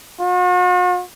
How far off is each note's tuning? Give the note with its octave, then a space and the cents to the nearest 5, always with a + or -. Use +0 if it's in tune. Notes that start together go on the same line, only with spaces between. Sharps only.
F#4 -45